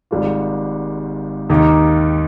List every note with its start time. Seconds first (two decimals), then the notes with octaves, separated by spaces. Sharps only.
0.11 G#1 G#2 G3 A#3 F4
1.50 D#2 D#3 A#3 D#4 G4